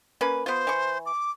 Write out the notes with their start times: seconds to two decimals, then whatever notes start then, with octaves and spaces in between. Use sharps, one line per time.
0.21 A#3 C#4 B4
0.46 B3 F4 C5
0.67 E3 C#6
1.06 D6